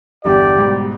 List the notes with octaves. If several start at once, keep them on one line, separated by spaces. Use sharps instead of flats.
G1 E2 D3 G4 D5
G#2 B2 G3